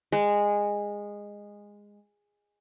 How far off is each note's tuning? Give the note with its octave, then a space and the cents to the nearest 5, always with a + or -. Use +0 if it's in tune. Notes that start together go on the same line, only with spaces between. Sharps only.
G#3 -15